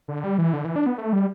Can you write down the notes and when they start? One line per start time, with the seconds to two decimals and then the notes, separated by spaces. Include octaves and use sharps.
0.08 D3
0.24 G3
0.38 E3
0.53 D3
0.65 E3
0.76 D4
0.86 B3
0.98 A3
1.13 G3